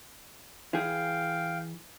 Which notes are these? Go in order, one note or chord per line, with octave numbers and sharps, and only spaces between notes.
E3 G#4 F5 G5